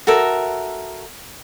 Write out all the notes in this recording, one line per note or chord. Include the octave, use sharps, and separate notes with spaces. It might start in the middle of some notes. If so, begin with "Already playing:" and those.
F#4 A4 A#4 E5